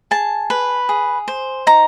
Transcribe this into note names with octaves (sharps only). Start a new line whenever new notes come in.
G#4 A5
B4
G#4
C5
D#4 A#5